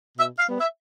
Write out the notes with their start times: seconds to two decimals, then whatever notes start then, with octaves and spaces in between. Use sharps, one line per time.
0.18 B2 E5
0.39 F5
0.49 G3 B3
0.59 E5